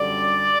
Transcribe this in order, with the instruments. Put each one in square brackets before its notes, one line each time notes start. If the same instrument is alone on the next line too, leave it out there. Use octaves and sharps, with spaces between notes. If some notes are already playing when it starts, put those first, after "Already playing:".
Already playing: [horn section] F#2 D3 G3 D5